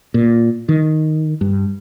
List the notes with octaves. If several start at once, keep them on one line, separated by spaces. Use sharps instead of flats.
A#2
D#3
G2